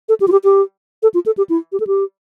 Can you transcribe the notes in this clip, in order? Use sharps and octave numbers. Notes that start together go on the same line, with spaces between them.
A4
G4
F4
G4
G4
A4
F4
A4
G4
E4
G4
A4
G4